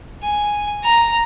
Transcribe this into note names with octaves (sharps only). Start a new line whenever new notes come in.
G#5
A#5